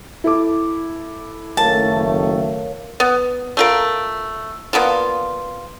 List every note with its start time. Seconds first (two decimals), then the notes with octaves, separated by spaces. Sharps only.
0.24 E4 A4 D6
1.57 F#1 D#3 A3 A#4 C#5 F5 A5
3.00 B3
3.57 A3 F4 A#4
4.73 A#3 B3 D4 F4